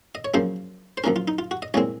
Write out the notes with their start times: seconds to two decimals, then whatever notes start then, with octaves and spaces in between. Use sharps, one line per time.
0.15 D#5
0.25 C#5
0.34 F#2 C#3 F3 A#3 C5
0.98 C5
1.04 F#2 F3 A#3 C#4 A#4
1.16 F4
1.28 D#4
1.39 F4
1.51 F#4
1.62 D#5
1.74 C2 A#2 G#3 C4 C#5